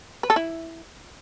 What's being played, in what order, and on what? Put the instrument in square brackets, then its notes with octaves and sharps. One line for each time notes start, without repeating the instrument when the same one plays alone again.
[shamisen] B4
A4
E4